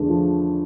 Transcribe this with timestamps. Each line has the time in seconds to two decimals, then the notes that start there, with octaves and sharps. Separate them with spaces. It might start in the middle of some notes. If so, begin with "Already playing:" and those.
Already playing: E2 D3 A3
0.09 F3